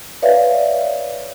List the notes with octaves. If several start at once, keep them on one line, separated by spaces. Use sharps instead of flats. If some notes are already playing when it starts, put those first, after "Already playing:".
B4 C#5 D5 E5 F5